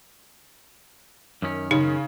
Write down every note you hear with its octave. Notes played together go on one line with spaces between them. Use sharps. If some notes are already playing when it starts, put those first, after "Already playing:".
F#2 D#3 C#4
C#3 D#4